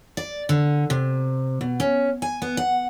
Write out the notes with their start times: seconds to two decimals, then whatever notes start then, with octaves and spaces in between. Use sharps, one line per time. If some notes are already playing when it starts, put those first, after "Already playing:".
0.17 D5
0.49 D3
0.90 C3
1.61 B2
1.80 C#4
2.22 G#5
2.42 B3
2.57 F#5